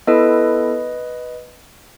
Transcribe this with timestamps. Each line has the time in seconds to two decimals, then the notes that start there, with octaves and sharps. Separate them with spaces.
0.07 B3 E4 A4 B4 D#5